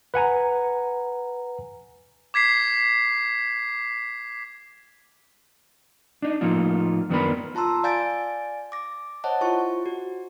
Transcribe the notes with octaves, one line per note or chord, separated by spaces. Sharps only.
B4 F#5 G#5 A#5
D6 G#6 B6 C7
D4 D#4
A2 F3 A#3 D#4 F4
F#2 D#3 B3 D4 A#4 B5
F4 A5 A#5 C6 E6
D5 F5 G#5 G6 A6 D7
D6 A#6
C5 C#5 D#5 F#5 A5
E4 F4 C5 C#6
F#4